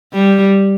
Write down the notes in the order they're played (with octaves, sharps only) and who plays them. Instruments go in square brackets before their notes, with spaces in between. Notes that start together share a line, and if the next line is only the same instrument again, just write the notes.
[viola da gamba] G3